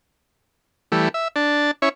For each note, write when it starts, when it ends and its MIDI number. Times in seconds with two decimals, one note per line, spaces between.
0.92 1.09 52
0.92 1.09 55
0.92 1.09 57
1.14 1.28 76
1.36 1.71 62
1.36 1.71 81
1.82 1.89 61
1.82 1.89 64
1.82 1.89 73